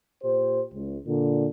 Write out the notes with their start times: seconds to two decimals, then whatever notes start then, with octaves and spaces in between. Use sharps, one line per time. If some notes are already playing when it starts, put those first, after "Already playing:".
0.23 A#2 G4 C5
0.74 C#2
1.06 A#2 D3